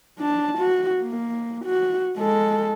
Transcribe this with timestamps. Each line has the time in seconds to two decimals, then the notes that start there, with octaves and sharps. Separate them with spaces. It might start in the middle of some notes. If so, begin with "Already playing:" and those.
0.19 D4 A5
0.58 F#4
1.02 A#3
1.65 F#4
2.17 G#3 A4